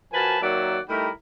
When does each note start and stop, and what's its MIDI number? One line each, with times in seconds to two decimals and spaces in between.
0.13 0.41 53
0.13 0.41 66
0.13 0.41 70
0.13 0.41 71
0.13 0.41 80
0.13 0.41 81
0.41 0.79 51
0.41 0.79 54
0.41 0.79 58
0.41 0.79 74
0.41 0.79 76
0.41 0.79 78
0.89 1.09 55
0.89 1.09 57
0.89 1.09 63
0.89 1.09 64
0.89 1.09 67
0.89 1.09 70